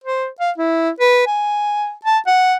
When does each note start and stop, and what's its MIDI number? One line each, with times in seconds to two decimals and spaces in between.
0.04 0.27 72
0.40 0.51 77
0.58 0.90 64
1.00 1.23 71
1.26 1.92 80
2.05 2.18 81
2.27 2.56 78